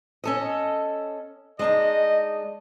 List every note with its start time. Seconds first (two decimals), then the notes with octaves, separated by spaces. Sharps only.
0.24 C#4 A4 D#5
1.59 G#3 D4 D#4 D#5